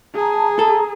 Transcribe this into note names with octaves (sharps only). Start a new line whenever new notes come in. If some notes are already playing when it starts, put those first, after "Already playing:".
G#4 A5 A#5
A4 A#5